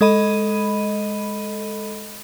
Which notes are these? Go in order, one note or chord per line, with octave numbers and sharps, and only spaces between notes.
G#3 A4 D#5 B5 D#7